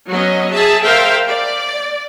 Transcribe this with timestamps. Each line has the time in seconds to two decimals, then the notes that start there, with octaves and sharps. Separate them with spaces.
0.11 F#3 B3 C#4 D#5
0.52 G#4 E5 A5
0.84 A#4 C5 E5 F5 G5
1.29 D5